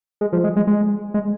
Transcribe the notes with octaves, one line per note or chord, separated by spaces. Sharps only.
G#3
F3
G#3
G#3
G#3
G#3